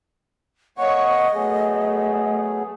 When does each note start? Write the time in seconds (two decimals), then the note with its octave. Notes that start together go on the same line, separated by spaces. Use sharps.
0.78 A#3 C#5 D#5 F#5 C#6
1.34 F#3 A3 B3 G#4